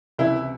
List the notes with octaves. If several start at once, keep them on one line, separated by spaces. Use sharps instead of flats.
C#2 C3 E3 E4